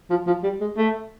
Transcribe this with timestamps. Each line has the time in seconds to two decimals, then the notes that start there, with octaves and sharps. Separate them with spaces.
0.10 F3
0.27 F3
0.44 G3
0.61 G#3
0.78 A3